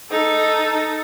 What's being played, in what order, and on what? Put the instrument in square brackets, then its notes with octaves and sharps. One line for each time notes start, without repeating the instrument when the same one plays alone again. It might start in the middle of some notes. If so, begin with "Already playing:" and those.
[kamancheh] D#4 [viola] A4